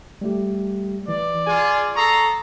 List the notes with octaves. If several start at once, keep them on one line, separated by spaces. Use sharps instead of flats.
G3 A3 G4
E3 D5
F4 G#4 G#5
A4 A#5 C#6 D#6 C7